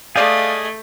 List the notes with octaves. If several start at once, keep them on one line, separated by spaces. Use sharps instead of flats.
A3 G#4 D5 D#5 F5 G6